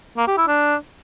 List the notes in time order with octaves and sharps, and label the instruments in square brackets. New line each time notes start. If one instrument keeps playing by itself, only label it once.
[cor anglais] A#3
G4
E4
D4